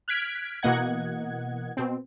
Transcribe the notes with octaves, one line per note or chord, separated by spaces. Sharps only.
F6 F#6 G#6 B6 D7
B2 E3 A#3 D#5 F#5 G#6
B2 C4